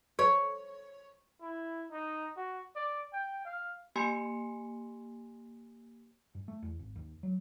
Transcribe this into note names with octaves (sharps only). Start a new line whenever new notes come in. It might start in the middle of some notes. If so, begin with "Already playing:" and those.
C#5
E4
D#4
F#4
D5
G5
F5
A#3 G4 G#5 B5 C6 C#7
G2
A3
E2
G#1
D#2
F#3